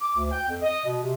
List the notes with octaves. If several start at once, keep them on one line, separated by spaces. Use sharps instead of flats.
D6
D2
G5
F2
D#5
B2
C3